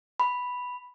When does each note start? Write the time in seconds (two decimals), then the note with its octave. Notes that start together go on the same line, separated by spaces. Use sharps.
0.20 B5